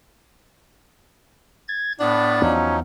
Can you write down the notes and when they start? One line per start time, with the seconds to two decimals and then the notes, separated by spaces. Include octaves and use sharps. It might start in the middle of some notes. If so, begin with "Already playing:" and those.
1.68 G#6 A6
2.00 A2 B3 D4 A6
2.42 E2 F3 F#3 B3 C#4 D#4